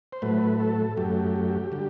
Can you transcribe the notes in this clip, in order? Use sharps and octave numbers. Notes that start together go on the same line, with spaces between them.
C5
A2 F#3 A3 B4
A4
F#2 F#3 A3 G4
D3 G3